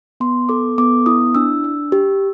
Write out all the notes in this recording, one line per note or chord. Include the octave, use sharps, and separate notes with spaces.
B3 C6
A4 D6
B3 D6
E4 D#6
D4 E6
D4
G4